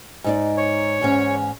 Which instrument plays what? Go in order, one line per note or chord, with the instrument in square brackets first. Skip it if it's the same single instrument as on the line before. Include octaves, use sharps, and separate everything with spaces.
[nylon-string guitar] G#2 D#4 D5
[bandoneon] C#5
[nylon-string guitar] E2 G#2 C#4